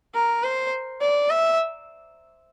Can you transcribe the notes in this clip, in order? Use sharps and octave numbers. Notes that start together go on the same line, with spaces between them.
A#4
C5
D5
E5